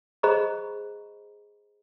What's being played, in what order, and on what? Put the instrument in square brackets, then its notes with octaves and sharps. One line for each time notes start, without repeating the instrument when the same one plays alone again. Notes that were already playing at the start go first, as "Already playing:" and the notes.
[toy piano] G#4 C5 D#5 A#5 B5 C#6